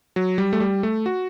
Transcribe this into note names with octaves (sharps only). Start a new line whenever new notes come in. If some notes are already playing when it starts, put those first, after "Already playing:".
F#3
G3
A3
G3
A3
F#4